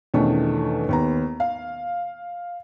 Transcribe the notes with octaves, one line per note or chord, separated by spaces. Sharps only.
E2 B2 D#3 A3 C#4 D4
D#2 B3 A#5
F5